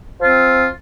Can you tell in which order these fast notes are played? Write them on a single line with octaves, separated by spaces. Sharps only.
F3 F4 C4